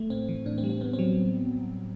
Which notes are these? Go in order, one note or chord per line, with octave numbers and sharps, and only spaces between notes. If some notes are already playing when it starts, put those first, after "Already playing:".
Already playing: A3
A2 C4
E3
A2 D4
C4
G3
C4
A2 B3
C4
F#3